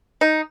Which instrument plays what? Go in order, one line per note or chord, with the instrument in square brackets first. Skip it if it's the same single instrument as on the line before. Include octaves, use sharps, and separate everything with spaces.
[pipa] D#4